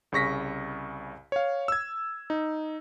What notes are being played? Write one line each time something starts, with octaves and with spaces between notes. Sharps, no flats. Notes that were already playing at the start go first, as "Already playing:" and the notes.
C2 C#3 C#6 A#6 B6
C#5 F5
E6 G#6
D#4